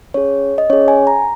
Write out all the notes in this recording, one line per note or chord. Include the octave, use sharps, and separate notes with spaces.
C#4 G#4 C#5
D#5
C#4 G#4 C#5
G#5
A#5